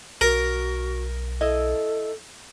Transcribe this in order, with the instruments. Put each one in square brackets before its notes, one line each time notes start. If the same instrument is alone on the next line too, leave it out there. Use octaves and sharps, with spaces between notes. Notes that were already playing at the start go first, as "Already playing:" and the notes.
[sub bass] B1 [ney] F#4 [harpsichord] A#4
[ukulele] E4 D#5 [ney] A4